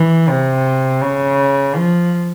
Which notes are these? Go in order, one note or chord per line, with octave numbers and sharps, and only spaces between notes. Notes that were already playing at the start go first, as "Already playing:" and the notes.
Already playing: E3
C3
C#3
F3